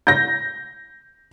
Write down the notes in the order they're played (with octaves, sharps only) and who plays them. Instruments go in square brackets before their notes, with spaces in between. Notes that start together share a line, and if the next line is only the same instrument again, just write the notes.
[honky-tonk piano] G6 A#6